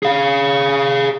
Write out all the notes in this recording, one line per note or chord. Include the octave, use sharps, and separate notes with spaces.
G#4 F5